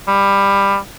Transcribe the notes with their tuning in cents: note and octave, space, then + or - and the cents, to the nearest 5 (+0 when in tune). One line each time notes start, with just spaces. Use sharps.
G3 +20